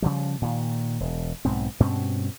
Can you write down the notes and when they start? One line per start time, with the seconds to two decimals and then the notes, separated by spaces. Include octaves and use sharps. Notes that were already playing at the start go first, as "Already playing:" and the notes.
0.02 C#3 F3 G3
0.42 A#2 D#3
1.00 E1
1.45 B1 G#2 B3 C4
1.80 G2 B2 C4 C#4